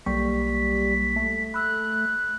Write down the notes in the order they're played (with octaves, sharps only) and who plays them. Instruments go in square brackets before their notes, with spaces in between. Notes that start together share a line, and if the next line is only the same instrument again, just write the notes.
[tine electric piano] B1 A#3 C#6 [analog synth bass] G3 [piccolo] B6
[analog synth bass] A3
[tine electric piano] B5 E6 [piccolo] F#6